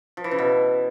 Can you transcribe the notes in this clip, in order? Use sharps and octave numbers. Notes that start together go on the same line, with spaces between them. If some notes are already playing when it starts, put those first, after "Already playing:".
F3
E3
C#3
B2